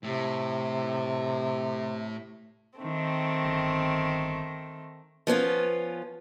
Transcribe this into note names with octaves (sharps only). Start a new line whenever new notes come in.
A2 C3
D#3 A3 C4
G1
F3 B3 C#4 F4